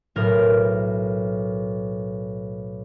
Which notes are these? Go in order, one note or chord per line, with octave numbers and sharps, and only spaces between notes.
B1 A2 A#4